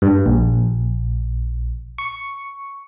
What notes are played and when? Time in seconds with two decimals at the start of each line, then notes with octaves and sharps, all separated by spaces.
0.02 G2
0.26 A#1
1.98 C#6